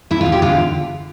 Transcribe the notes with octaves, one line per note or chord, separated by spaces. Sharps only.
E2 E4
F4
E2
G4
D3 F4